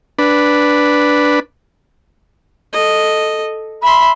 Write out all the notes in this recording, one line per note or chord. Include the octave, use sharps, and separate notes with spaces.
D4 B4
A4 D#5
E5 B5 C6